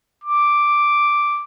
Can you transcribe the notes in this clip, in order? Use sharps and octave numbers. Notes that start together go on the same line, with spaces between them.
D6